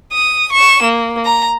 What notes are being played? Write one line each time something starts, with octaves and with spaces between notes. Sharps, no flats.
D#6
C#6 E7
A#3
A#5